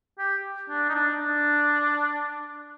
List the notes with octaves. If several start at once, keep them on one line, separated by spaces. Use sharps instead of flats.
G4
D4
D#4
D4
D4